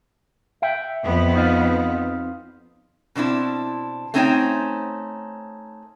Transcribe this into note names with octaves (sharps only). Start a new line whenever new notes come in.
E5 G5
F2 B3
C4 D#4 F4
B2 C4 D4 E4
A3 C4 C#4 D#4 C5 G5